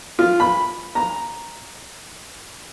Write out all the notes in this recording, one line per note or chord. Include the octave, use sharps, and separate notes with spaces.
F4
B5
A#5